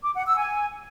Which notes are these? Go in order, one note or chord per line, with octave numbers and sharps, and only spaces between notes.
D6
F#5
E6
G#5